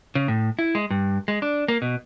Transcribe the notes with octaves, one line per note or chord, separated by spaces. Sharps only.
C#3
A2
E4
G#3
G2
G#3
D4
A#3
B2